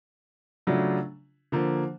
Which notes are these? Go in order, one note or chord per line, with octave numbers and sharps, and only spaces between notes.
C#3 F#3 A3 D4 F4
D3 F3 A#3